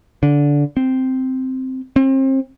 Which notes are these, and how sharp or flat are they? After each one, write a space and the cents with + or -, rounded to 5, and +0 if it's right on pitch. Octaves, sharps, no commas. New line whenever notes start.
D3 -15
C4 -5
C4 +35